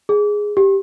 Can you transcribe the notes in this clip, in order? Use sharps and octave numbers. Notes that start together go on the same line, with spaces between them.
G#4
G4